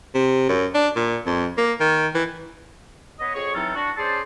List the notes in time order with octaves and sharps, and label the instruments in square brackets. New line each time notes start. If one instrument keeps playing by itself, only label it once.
[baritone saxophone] C3
F#2
D4
A#2
F2
A#3
D#3
E3
[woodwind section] B3 B4 C#5 D#5
F2 G#4 C#5 C#6
E3 F#3 C4 D#4 F4 A4
D4 F#4
C#4 G#4 C5 D5 A5 C6